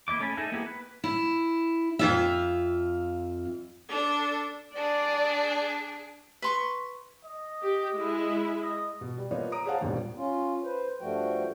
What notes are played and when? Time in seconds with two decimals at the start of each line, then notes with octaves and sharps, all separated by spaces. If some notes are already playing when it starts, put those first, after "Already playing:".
0.08 A#3 E4 D#5 D6
0.19 A3 C#4 A4 G#5 B5
0.37 D#4 G#4 A4 D#5 E5
0.52 A#3 B3 E4 G4 G#4
0.66 B4
1.04 E4
1.99 F2 F4 E5
3.89 D4 A4
4.76 D4 G#4 D5
6.42 B4 C6 C#6
7.25 D#5
7.62 G4
7.93 G#3 E4
8.62 D#5
9.01 B2
9.18 G3
9.31 F3 A#3 B3 F4 C#5 D#5
9.52 A#5 D#6 D7
9.65 G#4 C5 C#5 F5 F#5 A5
9.81 D#1 A#1 D#2 B2 G3
10.17 C#4 F4
10.64 B4 C5
11.01 G2 F3 G3 A3 F#4 G5